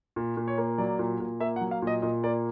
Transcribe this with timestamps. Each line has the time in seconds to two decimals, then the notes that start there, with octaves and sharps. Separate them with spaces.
0.16 A#2
0.37 A#2
0.48 C#5
0.58 A#3
0.78 F#3 D5
0.99 A#2
1.20 A#2
1.40 A#3 E5
1.56 F#5
1.61 F#3
1.71 F5
1.82 A#2
1.87 D#5
2.02 A#2 D#5
2.23 A#3 D5